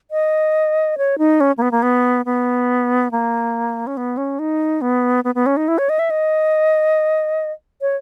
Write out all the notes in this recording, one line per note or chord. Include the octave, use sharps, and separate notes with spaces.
D#5
C#5
D#4
C#4
A#3
B3
A#3
B3
B3
A#3
C#4
B3
C#4
D#4
B3
B3
B3
C#4
D#4
E4
C#5
D#5
E5
D#5
C#5